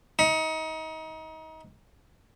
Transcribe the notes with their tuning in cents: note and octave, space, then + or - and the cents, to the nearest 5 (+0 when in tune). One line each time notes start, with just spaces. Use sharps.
D#4 +30